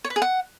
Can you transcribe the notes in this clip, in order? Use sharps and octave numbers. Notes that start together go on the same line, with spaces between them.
C#5
B4
G#4
F#5